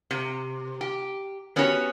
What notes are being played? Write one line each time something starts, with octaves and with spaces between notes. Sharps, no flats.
C3
G4
B3 C#4 F#4 G4 B4 C#5